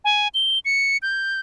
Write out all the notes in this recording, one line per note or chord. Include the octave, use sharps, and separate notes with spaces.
G#5
G7
C#7
G6